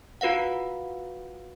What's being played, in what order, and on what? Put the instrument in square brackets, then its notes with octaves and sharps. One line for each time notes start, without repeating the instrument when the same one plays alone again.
[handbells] F4 F#4 B4 F5 F#5